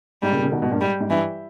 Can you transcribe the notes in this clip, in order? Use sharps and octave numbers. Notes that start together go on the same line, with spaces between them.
G#2 G3
A#2 C#3
A#2 C#3
B2 D#3
G#2 B2
G2 A#2
G#2 G3
G#2
G2 E3